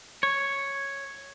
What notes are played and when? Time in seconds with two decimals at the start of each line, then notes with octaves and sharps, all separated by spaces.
0.23 C#5